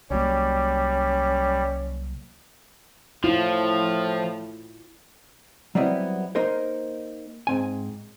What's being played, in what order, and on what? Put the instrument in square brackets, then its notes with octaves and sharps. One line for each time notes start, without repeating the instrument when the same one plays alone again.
[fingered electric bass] C2 F#3 A#3 [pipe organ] G3 [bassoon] C#4
[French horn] A2 [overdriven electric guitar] F3 [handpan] E4 F4
[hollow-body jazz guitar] F#3 G3 B3 C4 E4 D#5
A#3 D#4 A#4 C5
G#2 C4 G#5